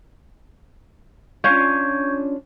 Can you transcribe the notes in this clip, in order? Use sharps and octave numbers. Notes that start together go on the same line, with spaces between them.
C#4 D4 F4 C#6 G6 G#6